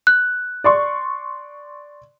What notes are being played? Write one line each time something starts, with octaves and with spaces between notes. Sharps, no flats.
F#6
D5 C6 C#6